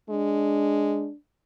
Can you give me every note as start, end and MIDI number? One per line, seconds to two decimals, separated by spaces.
0.10 1.09 56
0.10 1.16 62